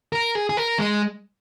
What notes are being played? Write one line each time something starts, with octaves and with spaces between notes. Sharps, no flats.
A#4
G#4
G#4
A#4
G#3